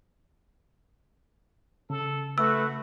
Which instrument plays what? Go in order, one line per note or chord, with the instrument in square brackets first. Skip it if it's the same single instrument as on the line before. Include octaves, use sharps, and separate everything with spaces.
[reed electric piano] C#3 [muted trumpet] A4
[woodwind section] A3 B4 [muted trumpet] F#4 [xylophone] E6